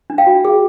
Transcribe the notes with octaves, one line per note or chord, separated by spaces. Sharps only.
D4
F5 G5
F#4
G#4